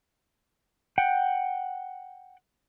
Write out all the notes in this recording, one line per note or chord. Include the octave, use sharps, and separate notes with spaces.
F#5 G5